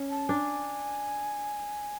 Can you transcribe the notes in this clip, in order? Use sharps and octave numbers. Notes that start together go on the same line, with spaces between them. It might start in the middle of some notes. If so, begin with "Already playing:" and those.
Already playing: C#4
A5
D4 G#5